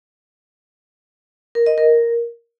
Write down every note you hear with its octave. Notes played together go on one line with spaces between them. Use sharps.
A#4
D#5
A#4